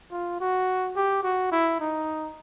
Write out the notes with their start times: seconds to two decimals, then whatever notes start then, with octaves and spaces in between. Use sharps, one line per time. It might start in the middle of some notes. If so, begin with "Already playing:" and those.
0.11 F4
0.40 F#4
0.96 G4
1.23 F#4
1.51 E4
1.80 D#4